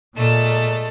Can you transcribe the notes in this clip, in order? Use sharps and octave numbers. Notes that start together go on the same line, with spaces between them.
A#2 G#3 A3